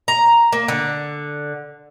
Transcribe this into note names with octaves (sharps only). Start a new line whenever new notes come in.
A#5
A#3
D3